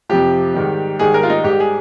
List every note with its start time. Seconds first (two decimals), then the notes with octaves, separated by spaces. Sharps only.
0.09 F2 C3 F3 G4
0.54 G#2 D#3 G3
0.99 G#2 D#3 G3 G#4
1.14 A#4
1.23 F4
1.30 D#4
1.44 G#2 G3 G4
1.60 G#4